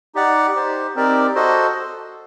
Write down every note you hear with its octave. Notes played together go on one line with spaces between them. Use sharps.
D#4 G4 D5 F#5
D#4 G4 C5
C4 D#4 G4 A#4 D5
F#4 A4 C5 D#5